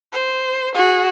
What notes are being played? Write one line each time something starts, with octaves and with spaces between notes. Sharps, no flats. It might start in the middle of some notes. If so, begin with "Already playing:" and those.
C5
F#4 G#4